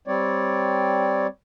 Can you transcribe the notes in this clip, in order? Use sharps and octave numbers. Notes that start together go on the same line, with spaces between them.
G3 C4 C#5 D5